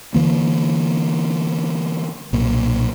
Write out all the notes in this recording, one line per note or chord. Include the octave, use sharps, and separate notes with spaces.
D3 E3 A#3
B1 A#2